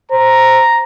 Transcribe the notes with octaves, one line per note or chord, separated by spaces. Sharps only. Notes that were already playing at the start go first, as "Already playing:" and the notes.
C5 A#5